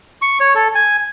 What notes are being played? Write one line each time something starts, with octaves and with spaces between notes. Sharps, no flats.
C#6
C#5
A4
G#5